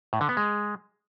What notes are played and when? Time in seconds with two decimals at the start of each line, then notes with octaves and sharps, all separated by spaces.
0.13 A2
0.21 D3
0.29 B3
0.37 G#3